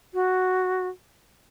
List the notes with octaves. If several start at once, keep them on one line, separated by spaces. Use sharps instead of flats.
F#4